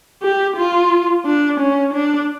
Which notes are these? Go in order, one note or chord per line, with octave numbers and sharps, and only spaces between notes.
G4
F4
D4
C#4
D4